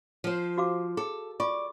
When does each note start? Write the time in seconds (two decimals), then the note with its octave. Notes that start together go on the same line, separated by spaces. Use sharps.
0.24 F3 C5
0.58 F#4 F5 D6
0.97 G#4 A4
1.40 F4 D5 C#6 D6